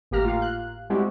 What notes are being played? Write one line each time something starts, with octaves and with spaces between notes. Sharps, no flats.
G#1 A2 A#3 G4 A#5 F6
F4 F5
F#6
G3 G#3 C4 E4 F#4 G4